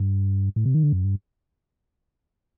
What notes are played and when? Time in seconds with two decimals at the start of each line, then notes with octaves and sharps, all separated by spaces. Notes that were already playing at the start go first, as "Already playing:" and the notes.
Already playing: G2
0.56 A2
0.66 C3
0.74 D#3
0.83 D3
0.93 F#2
1.04 G2